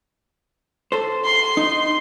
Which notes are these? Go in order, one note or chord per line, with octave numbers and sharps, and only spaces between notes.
A4 C5
C6
D#4